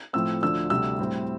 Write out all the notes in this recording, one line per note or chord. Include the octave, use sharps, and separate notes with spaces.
A2 F3 A3 C4 E6
D2 D3 F3 E6
D2 C3 G3 D4 E6
A2 G3 C4